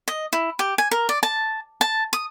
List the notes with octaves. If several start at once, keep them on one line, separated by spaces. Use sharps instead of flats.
D#5
E4
G4
G#5
A#4
D5
A5
A5
D#6